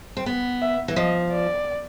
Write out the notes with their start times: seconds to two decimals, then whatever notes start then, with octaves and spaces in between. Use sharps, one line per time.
0.17 C4
0.26 B3
0.62 E5
0.88 E3
0.96 F3 D#5
1.31 D5